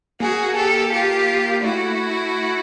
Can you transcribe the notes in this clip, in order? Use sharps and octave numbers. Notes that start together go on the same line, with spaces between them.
A#3 F#4 G#4
G4 A4
F4 G4
A3 E4 F#4